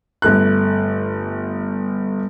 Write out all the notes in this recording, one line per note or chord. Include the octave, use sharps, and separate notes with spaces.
G1 A3 F#6